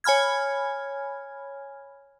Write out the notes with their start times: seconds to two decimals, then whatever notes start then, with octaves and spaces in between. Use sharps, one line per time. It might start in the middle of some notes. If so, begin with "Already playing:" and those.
0.04 C#5 G#5 B5 F6 G#6